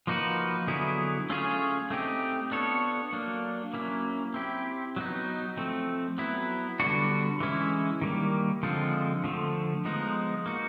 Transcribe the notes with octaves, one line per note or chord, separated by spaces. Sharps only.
F3 A#3 D#4 F#4 B4
D3 F#3 B3 E4 G#4
A3 C#4 F4 G#4 C#5
A3 C4 D#4 G4
B3 D4 F4 A4 C#5
F#3 A#3 D4
F#3 A#3 C#4 E4
C4 E4 G4
F#3 B3 D#4
F3 A3 C4
F#3 B3 E4
D3 G3 B3 D4 F#4
E3 G#3 C#4 E4
D#3 G3 A#3
D3 F3 G#3 C4 F4
D3 F3 A3
F3 G#3 B3 D#4
A#3 D#4 F#4